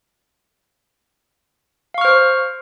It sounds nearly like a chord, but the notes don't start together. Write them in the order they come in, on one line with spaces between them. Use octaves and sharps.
F5 C#6 F6 C5